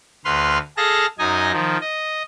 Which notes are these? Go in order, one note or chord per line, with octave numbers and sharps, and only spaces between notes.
D2 B4 C6 F6
G#4 A4 F5 A5 A#6
F#2 D#4 D#5 G#5
D#3 F3
D#5